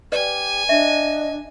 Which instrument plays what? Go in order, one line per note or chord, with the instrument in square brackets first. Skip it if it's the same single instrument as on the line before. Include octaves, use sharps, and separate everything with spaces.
[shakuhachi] G4 [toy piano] B4 D5 [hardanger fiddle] G#5
[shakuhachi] D4 [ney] D#5 [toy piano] E5